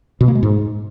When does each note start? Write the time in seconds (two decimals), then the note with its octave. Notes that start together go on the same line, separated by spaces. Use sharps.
0.21 B2
0.28 A#3
0.35 G#3
0.43 G#2